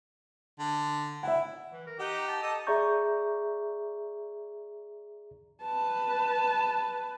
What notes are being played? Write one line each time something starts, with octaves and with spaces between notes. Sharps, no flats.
D3
E4 E5 F#5
E3
A#4
D#4 G4 F#5
A5
A4 D#5
G#4 D5 E5 A#5 C#6 G6
B4 A5